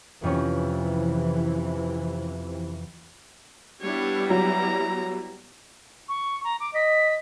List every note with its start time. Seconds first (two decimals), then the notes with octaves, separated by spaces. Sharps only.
0.24 F2 C3 E3 C#4
3.81 G3 B3 D4 E4 C#5
4.30 F#3 A#5
6.08 C#6
6.44 A#5
6.60 D6
6.74 D#5 B6